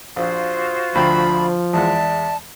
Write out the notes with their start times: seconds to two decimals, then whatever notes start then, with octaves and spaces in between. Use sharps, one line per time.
0.16 A#1 F4 F#4 C5
0.95 D2 F3 G5 A#5 B5
1.73 E2 G#3 D5 E5 F#5 A5